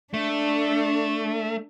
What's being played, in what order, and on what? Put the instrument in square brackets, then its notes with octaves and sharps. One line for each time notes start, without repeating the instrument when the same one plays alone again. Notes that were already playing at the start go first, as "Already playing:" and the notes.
[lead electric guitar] A3 [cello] D4